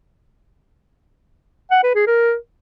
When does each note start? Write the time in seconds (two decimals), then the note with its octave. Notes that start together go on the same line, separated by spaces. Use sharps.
1.72 F#5
1.83 B4
1.95 G#4
2.07 A#4